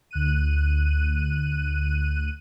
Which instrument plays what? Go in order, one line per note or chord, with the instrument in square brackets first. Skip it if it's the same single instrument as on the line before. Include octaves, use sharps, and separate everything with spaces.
[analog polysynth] D2 F#6 D#7